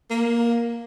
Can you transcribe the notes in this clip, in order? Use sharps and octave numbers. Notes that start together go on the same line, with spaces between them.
A#3